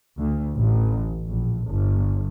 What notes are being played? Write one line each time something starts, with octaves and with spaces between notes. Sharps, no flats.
D2
A1
A#1
G1